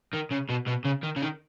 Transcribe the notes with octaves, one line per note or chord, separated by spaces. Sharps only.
D#3
C#3
B2
B2
C#3
D#3
C#3
D#3